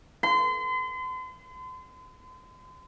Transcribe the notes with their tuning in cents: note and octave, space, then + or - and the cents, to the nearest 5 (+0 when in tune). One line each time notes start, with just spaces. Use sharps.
C6 -40